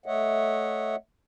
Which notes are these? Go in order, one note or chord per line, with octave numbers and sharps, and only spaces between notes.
A3 C#5 D#5 E5 F#5